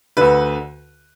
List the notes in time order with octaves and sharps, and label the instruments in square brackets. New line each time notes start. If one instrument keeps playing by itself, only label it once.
[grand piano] D2 D3 B4